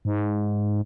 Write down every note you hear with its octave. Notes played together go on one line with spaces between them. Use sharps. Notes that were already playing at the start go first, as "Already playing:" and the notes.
G#2